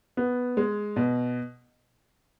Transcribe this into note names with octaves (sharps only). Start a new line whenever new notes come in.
B3
G#3
B2